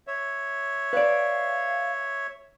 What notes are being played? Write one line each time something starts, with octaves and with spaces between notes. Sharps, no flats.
C#5 E5
B4 D5 F5